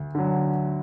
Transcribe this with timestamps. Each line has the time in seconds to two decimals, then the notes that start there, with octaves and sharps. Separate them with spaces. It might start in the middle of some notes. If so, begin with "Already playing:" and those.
Already playing: D2
0.15 D3 F#3